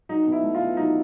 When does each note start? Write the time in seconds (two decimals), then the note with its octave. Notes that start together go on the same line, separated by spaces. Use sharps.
0.09 F#3 D#4
0.26 B2
0.32 E4
0.43 A3
0.55 F4
0.60 B2
0.77 F#3 D#4